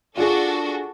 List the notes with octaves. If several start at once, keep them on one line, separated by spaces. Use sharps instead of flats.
D4 F4 F#4 G#4 A4